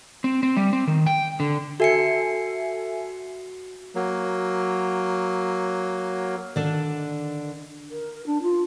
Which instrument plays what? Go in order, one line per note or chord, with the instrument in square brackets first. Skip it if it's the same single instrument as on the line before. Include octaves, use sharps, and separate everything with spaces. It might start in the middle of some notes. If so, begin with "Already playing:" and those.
[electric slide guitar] C4
C4
G3
C4
D#3
G5
D3
[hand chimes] F#4 C7 C#7 [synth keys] A4 E5 G#5
[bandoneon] F#3 A#3
[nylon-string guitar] D3 D4 [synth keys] D#3
[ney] A#4
D4
F4